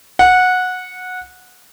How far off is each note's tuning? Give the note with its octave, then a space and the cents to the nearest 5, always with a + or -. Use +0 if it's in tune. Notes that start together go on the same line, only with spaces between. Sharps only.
F#5 -15